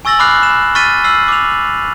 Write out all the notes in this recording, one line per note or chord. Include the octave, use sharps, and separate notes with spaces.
G#5 C#6 E6 A6 A#6 F#7
B5 D6 F6 F#6 C7
E7
C#6 F6 A6 B6 D#7
E6 F6 C7 F#7
D6 F7